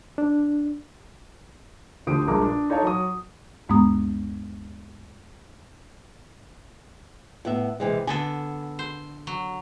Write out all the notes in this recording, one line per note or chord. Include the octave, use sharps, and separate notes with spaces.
D4
D2 F3 G4 C5 D#6 D7
A#1 G2 G#3 A#4 A#5 D6
D4
D#4 A4 C#5 F5 A5
F#3 D#6
D2 G2 G#3 B3 A#5 D#6
A2 B3 E5
C3 E3 G#3
D3 B3 A4 G#5
C5
F#3